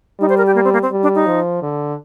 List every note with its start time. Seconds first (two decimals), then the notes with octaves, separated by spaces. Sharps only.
0.20 G3 D#4
0.29 C5
0.38 A#4
0.47 G4
0.55 A#3
0.65 C4
0.73 A#3
0.82 C4
0.91 G3
1.03 D4
1.15 D#4
1.26 F3
1.62 D3